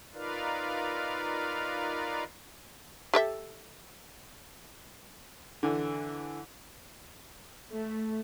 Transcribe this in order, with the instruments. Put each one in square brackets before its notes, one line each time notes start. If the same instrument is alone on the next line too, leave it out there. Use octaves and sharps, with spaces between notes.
[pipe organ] D#4 F4 A#4 B4 D5 F5
[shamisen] G4 A4 E5
[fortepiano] D3 E3
[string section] A3